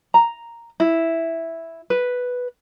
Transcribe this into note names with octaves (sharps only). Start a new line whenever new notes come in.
A#5
E4
B4